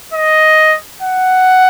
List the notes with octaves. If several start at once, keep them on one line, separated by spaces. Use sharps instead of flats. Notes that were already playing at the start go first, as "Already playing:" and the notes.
D#5
F#5